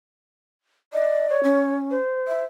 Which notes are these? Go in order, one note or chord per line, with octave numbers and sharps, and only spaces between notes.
D5 D#5
C#5
C#4
C5
E5